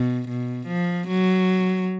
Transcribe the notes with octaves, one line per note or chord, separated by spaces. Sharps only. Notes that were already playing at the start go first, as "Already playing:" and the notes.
Already playing: B2
B2
F3
F#3